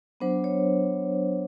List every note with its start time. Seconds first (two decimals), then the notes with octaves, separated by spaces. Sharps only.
0.20 F#3 B3 D4 C5
0.44 C#5